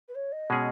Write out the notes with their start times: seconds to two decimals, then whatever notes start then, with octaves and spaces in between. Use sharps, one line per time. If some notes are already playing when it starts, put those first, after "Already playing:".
0.08 B4
0.15 C#5
0.32 D#5
0.50 B2 G#3 C#4 G#4